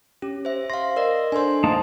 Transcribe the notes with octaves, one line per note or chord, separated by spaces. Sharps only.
C#4 G4
C5 E5
F5 C6 A#6
A#4 D5 D#5
D4 A4 C5 G#5 C6
A#3 D#4 A5